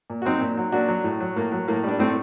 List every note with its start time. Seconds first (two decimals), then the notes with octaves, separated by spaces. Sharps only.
0.10 A#2
0.22 F#4
0.25 F#3 C4 D#4
0.41 A#2
0.57 F#3
0.72 A#2 D4 F#4
0.88 F#3
1.04 A2
1.20 F#3
1.36 A2 A#3
1.52 F#3
1.68 A2 A#3
1.84 G3 D4
1.99 A2 A3 C4